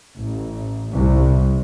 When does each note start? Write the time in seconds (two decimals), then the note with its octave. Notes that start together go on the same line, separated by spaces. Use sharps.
0.16 A1
0.92 C2